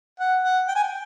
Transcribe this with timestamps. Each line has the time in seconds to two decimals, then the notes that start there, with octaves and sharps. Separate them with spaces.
0.19 F#5
0.43 F#5
0.67 G5
0.75 G#5
0.83 G5